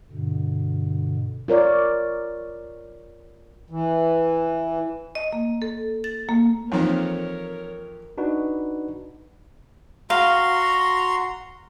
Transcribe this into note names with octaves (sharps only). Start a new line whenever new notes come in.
G2 B2 D3
F4 A#4 C#5 D5
E3
D#5
A#3
A4
A6
A#3
F2 E3 A#3 D#4 A#4 C#5 A#5
D4 D#4 F#4 B4
F#4 F5 A#5 C6